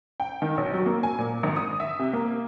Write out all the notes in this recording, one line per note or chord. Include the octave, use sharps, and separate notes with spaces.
G5
D#3
B1
F#3
A#3
G#5
A#2
G#1
D#6
E5
C3
A#3